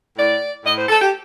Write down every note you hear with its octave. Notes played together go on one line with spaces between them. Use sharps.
A2 D5
A2 D#5
C5
A4
G4